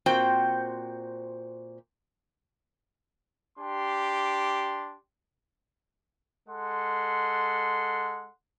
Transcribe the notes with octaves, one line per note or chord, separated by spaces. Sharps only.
A#2 C4 F#4 C5 G5
D4 G4 C6
G#3 A4 F#5 C6